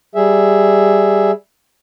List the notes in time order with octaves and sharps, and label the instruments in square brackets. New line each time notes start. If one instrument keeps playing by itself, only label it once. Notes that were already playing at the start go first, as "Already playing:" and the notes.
[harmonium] G3 G#4 E5